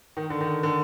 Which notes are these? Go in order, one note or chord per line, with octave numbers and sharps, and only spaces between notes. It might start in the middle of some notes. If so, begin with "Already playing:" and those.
D#3
D3
D#3
D3